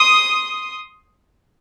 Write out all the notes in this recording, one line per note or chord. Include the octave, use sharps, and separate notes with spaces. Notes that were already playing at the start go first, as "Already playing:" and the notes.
Already playing: C6 D#6